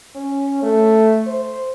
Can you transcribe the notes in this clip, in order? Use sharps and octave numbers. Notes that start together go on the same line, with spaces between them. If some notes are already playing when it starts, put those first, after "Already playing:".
C#4
A3
C5